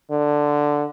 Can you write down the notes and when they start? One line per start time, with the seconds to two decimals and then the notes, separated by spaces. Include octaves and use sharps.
0.11 D3